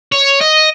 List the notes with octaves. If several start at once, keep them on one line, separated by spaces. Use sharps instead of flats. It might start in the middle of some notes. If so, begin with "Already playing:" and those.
C#5
D#5